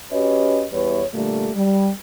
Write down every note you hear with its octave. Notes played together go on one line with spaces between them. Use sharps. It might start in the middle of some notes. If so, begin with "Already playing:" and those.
C#4 F#4 G4 B4 C#5 D#5
E2 E3 G3 B4 C#5
A#2 D3 G3 A3
G3